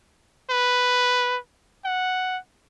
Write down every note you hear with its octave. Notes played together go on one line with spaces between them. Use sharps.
B4
F#5